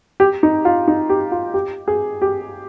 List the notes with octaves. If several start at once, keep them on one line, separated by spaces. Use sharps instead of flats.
G4
D#4
F4
D#4
G4
F4
G4
G#4
G4